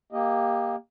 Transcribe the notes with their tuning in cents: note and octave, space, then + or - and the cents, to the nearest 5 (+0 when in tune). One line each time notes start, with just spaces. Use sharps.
A#3 +5 G4 +15 D#5 +0